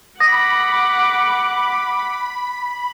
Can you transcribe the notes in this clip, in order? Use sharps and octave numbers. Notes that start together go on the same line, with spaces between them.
F#5 B5 D6 D#6 A#6